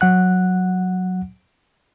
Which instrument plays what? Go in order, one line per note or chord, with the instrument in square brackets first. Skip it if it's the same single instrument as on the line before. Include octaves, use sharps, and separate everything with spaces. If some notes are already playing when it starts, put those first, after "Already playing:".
[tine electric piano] F#3 F#5 F#6